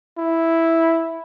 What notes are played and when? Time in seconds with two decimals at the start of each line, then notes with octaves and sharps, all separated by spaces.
0.18 E4